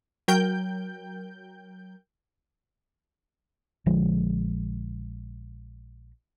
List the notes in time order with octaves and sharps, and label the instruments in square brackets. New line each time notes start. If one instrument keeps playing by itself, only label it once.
[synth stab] F#3 A#4 G5 G6
[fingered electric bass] A#1 D3 F3 G#3